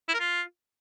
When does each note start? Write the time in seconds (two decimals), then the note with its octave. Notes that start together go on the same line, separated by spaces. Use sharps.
0.09 E4
0.14 A#4
0.20 F4